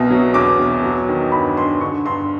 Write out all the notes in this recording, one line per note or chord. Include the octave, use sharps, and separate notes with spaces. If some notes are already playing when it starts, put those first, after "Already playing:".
Already playing: C2 B2
F#3
E2 D6
B2
F#3
D#3
G2 B5
G2 C6
D3 C#6
G2 C6